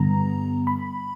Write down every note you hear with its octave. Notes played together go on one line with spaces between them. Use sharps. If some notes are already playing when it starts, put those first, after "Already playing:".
Already playing: G2 D3 G3 B3 A#5
B5